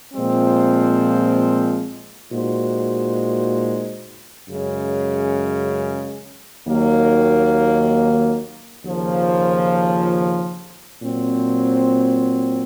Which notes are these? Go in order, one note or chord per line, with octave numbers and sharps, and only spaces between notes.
A#2 F3 G#3 C4
A#2 G#3 D#4 F#4 C5
F#2 C#3 G#3 C#4
D#2 D#3 F#3 A#3
D#2 C#3 F3 A#3
A#2 F#3 C4